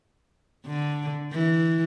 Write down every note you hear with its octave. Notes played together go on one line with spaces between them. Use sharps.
D3
E3